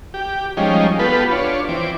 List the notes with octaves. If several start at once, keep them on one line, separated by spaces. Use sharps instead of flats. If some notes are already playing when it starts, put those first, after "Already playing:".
G4
F3 G3 G#3 C#4 D#4
B3 F4 G4 A4 B4
D4 F4 C#5
E3 C4 D6